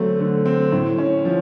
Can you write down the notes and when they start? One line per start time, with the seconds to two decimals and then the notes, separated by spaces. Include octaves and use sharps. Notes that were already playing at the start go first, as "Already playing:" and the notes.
Already playing: D3 F#3 A3 C4
0.19 D3
0.45 C4
0.72 A2
0.98 C#4
1.25 F3